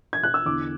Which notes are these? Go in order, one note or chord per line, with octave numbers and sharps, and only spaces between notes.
G#6
F#6
E6
E2 D3 D6